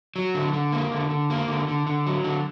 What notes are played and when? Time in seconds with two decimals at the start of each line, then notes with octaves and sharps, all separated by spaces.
0.16 F#3
0.35 D3
0.53 D3
0.72 A#3
0.92 D3
1.10 D3
1.30 A#3
1.48 D3
1.68 D3
1.87 D3
2.06 F#3
2.24 D3